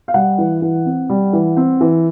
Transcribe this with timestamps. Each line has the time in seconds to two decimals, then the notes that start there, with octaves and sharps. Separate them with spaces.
0.08 F5
0.14 G3 F#5
0.38 E3
0.62 E3
0.86 C4
1.09 G3
1.33 E3
1.57 C4
1.81 E3